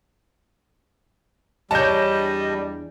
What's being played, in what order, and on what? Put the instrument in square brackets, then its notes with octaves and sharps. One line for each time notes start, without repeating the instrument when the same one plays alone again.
[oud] E2 D4 C#5 [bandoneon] G3 [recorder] D#5 [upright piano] A5 G6